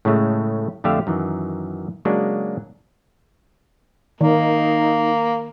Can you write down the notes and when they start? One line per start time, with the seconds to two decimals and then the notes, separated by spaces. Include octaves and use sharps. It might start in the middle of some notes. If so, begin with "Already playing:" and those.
0.05 A2 C#3 G#3 A3
0.84 F2 D3 A3 G4 E5 F5
1.07 F#2 D#3 E3
2.05 C#3 F#3 G#3 A#3 D4
4.21 D#3 A#3 D#4